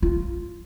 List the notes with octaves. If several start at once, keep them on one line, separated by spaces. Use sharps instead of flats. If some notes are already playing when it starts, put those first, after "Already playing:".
F4